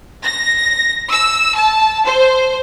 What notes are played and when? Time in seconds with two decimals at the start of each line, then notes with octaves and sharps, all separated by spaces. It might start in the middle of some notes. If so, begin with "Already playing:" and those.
0.24 A#6
1.09 E6
1.55 A5
2.04 C5